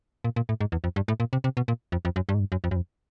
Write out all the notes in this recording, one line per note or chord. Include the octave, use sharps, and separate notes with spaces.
A#2
A#2
A2
G#2
E2
F2
G2
A2
A#2
C3
C3
B2
A#2
F2
F2
F#2
G2
G#2
G2
F#2
F2
F#2
F2